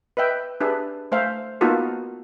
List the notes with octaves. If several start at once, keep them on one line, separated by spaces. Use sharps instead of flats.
B4 D#5 E5 G5
D4 G4 G#4 B4 E5
A3 C5 E5 F5
A#3 B3 D#4 F4 F#4 A4